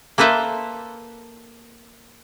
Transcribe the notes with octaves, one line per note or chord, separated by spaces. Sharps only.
A#3 A4 B4 C5 E5